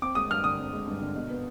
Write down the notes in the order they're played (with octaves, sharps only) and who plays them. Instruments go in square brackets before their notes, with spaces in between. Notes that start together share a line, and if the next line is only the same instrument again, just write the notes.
[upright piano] C4 [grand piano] D6
[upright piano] G#3 [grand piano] D#6
[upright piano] G2 [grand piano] F6
[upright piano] D3 [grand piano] D#6
[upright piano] C4
G#3
G2
D3
B2
B3